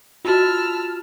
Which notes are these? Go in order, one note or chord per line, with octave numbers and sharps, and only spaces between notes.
F4 F#4 A5 E6 F6